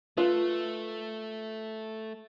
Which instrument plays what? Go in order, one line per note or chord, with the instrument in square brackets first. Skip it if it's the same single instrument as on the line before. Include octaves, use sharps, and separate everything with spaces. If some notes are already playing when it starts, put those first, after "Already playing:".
[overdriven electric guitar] A3 [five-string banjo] F4 B4